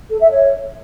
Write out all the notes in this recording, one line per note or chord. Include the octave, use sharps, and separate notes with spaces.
A4
E5
C#5